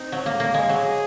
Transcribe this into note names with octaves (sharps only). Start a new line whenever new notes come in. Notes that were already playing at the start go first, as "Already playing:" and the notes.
Already playing: C4 D#4
F#3
A#3
A#3
G#3
F#3 G#4